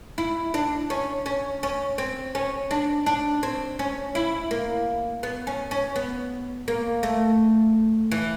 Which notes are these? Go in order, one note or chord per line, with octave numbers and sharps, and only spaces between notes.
E4
D4
C#4
C#4
C#4
C4
C#4
D4
D4
C4
C#4
E4
A#3
B3
C#4
C#4
B3
A#3
A3
E3